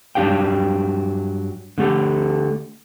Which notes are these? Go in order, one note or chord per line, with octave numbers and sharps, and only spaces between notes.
G2 F#3 D4 G4 F5 G5
D3 A3 G4 A4